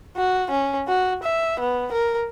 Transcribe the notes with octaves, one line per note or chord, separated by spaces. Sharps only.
F#4
C#4
F#4
E5
B3
A#4